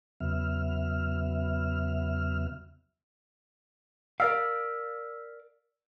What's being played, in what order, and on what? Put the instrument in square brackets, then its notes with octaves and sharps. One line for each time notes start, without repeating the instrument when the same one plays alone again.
[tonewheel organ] E2 C#3 F#3 B3 E5 F6
[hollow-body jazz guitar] A#4 D5 F5 [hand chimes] E6 F6 B6